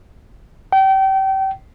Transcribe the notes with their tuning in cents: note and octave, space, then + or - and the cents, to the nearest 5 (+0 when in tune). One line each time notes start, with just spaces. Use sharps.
G5 -30